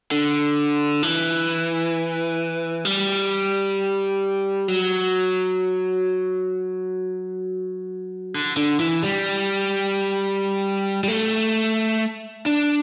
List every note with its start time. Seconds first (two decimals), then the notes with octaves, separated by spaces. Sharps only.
0.11 D3
1.03 E3
2.85 G3
4.68 F#3
8.34 D3
8.57 D3
8.80 E3
9.03 G3
11.04 G3
11.08 A3
12.46 D4